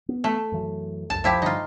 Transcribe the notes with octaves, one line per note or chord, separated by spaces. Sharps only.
B3
A3
F#2 E3 F#3
C2 F#2 A5
F3 E4 G4
G2 D3 D#4 F4